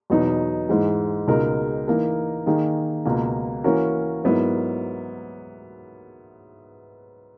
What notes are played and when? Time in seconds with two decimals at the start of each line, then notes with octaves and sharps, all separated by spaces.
0.10 E2 B2 F#3 B3 D#4
0.69 G#2 E3 G#3
1.28 C#2 B2 G#3 D#4 A#4
1.88 E3 A#3 D#4 A#4
2.46 D#3 A#3 D#4 G#4
3.05 C#2 B2 A#3
3.64 E3 A#3 C#4 F#4 A#4
4.24 G#2 F#3 B3 E4 A#4